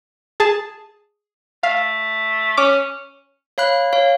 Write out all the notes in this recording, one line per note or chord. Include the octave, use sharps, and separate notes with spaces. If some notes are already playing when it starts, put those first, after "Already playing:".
G#4 A5
A3 F5
C#4 D6
C#5 F5 B5 F#6
C#5 F5